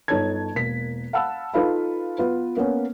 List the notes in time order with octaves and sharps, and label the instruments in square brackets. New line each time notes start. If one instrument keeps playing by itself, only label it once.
[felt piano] G1 D#4 A4 C#5 A5 G#6
E1 A#3 B6
F5 F#5 A5 B5 E6
D#4 F4 A4 B4 F5 B5
B3 F4 B4
A#3 B3 C#4